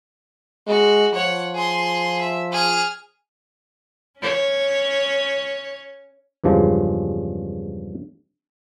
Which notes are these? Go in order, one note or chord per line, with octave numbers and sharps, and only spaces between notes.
G#3 F#4
F3 C#5 F#5
G#4 C6
E5
G#4 F6
C#4 C#5
E2 G2 C#3 F3 G#3